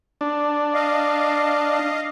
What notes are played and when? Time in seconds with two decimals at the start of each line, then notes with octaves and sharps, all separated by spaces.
0.21 D4
0.74 D#5 F5